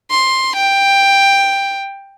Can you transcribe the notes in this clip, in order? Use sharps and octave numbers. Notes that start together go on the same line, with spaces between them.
C6
G5